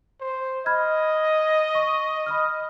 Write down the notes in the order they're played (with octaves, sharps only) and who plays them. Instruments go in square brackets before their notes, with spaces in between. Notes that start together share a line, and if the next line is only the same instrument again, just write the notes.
[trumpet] C5
[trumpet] D#5 [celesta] B5 F6 G#6
[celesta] C#6
B5 D#6 F6